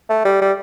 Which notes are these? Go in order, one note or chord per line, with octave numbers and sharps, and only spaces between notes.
A3
G3
G3